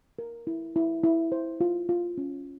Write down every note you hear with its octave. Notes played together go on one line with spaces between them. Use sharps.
A#4
E4
E4
E4
C5
F4
F4
C#4